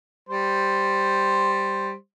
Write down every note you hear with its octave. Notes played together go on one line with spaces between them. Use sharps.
G3 C5